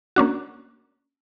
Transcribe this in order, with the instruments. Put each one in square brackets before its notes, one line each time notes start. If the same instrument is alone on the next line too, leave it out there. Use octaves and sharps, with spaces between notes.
[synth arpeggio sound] A#3 C#4 D4 F#4